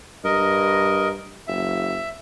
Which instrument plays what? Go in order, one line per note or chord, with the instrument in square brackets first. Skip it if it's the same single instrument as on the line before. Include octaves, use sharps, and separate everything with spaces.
[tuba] G2 [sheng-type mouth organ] A#4 D#5
[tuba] F#1 [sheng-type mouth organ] E5